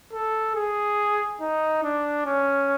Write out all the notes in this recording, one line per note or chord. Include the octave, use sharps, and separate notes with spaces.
A4
G#4
D#4
D4
C#4